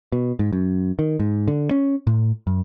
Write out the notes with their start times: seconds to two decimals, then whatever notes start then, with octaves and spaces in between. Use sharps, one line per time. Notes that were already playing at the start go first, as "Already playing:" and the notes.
0.12 B2
0.39 G#2
0.53 F#2
0.99 D#3
1.20 G#2
1.48 D3
1.71 C#4
2.07 A2
2.47 F#2